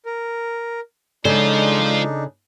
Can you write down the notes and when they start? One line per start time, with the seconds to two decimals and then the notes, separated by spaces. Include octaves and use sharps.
0.06 A#4
1.25 C#3 G#3 D4 D#4 F4 A4 C5 D5